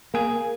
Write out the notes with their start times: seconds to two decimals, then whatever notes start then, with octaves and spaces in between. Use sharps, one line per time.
0.14 A#3 G#4